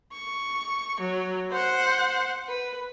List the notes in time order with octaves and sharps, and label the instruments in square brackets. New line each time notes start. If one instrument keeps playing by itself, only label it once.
[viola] C#6
F#3
C5 F#5
B4